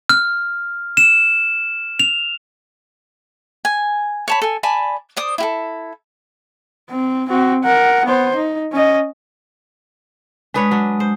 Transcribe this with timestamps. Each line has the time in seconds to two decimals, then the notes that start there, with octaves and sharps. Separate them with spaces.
0.09 F6
0.97 E7
2.00 F7
3.65 G#5
4.28 C#5 A5 B5
4.42 A4 G#5
4.63 D5 G#5 A5 B5
5.17 C5 D5 D#6
5.38 E4 G4 A4
6.90 C4
7.29 C4 F#4
7.63 A#4 F#5
8.06 B3 C5
8.36 D#4
8.72 C#4 D#5
10.54 G#3 D4 B4 C#5 D#6
10.71 F#3 D4
11.00 C5